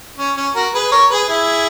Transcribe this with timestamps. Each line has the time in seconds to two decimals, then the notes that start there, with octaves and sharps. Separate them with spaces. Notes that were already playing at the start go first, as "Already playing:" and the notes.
0.18 C#4
0.36 C#4
0.55 F#4 A#4
0.74 G#4 B4
0.91 A#4 C#5
1.10 G#4 B4
1.29 E4 G#4